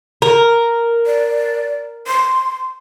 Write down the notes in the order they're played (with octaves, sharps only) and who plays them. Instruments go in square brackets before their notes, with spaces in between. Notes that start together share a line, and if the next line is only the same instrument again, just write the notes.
[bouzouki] A#4
[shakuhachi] D5
C6